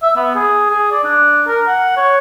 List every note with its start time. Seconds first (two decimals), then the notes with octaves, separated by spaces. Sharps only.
0.02 E5
0.16 B3
0.35 G#4
0.70 G#4
0.91 D5
1.04 D4
1.47 A#4
1.67 F#5
1.96 C#5